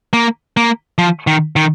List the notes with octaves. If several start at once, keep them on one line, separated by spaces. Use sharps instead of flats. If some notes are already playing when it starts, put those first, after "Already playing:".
A#3
A#3
F3
D#3
D#3